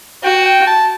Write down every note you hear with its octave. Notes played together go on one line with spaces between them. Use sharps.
F#4 G5
G5
A5